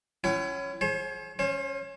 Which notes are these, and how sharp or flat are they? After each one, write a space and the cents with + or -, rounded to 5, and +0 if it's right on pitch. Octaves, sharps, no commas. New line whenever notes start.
C#4 +0 E4 +35 F#5 +40
G#4 +35 C5 +45
C#4 +0 C5 +40